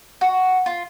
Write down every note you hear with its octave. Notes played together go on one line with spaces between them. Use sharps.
F#4
F4